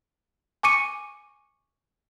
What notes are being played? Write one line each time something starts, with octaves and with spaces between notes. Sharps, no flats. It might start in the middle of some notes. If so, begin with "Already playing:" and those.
G#5 C#6 D6 C#7 D#7